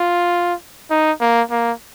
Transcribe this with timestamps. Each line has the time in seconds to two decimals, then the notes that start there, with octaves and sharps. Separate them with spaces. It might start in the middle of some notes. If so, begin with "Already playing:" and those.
Already playing: F4
0.90 D#4
1.21 A#3
1.51 A#3